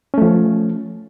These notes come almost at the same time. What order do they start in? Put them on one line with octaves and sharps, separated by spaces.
C#4 A3 F3